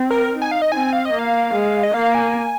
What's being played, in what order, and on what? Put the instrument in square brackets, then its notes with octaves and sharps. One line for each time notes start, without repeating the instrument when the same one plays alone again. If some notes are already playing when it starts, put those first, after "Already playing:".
Already playing: [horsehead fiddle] C4
[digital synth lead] A#4
[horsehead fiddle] D#4
[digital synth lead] G#5
F5
D#5
[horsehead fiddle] C4 [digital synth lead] G#5
[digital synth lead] F5
D#5
[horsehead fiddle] A#3
[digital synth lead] F5
[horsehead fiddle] G#3
[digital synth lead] D#5
[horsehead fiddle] A#3 [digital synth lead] F5
[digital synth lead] G#5